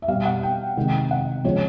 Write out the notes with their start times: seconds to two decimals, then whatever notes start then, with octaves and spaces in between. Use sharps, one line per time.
0.02 E5
0.08 B2 G3 F5
0.25 F#5
0.43 G5
0.77 C3 D#3 G#3
1.11 F#5
1.44 C#3 F3 G#3 C#5